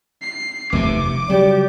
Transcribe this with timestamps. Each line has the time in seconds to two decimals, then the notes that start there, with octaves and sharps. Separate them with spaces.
0.22 C7
0.73 F1 D#2 C3 E3 A3 D6
1.29 C#3 F#3 G3 G4 D5